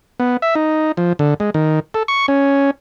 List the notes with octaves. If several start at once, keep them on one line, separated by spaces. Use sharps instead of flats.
B3
E5
D#4
F3
D3
G#3
D#3
A4
C#6
C#4